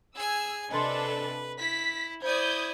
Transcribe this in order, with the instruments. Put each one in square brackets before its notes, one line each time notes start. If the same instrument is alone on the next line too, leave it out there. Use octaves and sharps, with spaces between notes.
[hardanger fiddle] G#4 G#5 [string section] E6
[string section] C3 D4 A4 [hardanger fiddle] B4 [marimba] D#5 C6
[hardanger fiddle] E4 [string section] B6
[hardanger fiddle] E4 D5 [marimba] C5 [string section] D#6 G6 G#6